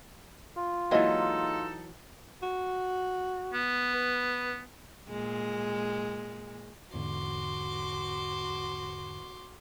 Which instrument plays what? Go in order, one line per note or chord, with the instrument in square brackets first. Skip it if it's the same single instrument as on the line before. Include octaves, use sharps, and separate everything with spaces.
[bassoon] F4
[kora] E3 F#3 [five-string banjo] G#3 A#3 D#5 [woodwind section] D#4 A4
[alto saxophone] F#4
[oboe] B3
[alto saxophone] B4
[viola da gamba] A#2 G#3
[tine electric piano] E2 G#2 D3 [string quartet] F#4 C6 D6